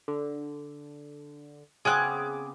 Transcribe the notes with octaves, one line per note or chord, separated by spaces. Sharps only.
D3
C#3 B3 C4 G#4 D6 F#6